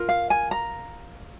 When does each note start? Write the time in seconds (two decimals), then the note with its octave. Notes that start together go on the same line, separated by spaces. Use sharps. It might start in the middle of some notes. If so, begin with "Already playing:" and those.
Already playing: F4 A#4
0.09 F5
0.30 G#5
0.51 A#5